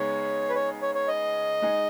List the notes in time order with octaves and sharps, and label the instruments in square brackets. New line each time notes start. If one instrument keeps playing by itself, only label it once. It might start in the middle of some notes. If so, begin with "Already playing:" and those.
Already playing: [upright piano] C#3 G#3 B3 D#4 [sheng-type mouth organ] C#5
[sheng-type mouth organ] B4
C#5
C#5
C#5
D#5
[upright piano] G#3 D#4 G#4